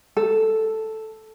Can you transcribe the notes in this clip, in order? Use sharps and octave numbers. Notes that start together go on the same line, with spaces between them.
A4